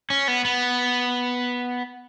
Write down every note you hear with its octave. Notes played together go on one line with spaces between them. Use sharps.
C#4
B3
B3